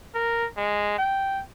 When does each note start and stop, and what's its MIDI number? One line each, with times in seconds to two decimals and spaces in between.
0.15 0.46 70
0.57 0.94 56
0.99 1.43 79